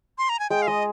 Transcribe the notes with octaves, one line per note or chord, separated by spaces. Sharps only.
C6
A#5
G#5
G#3 G5
F5
G#3 D#5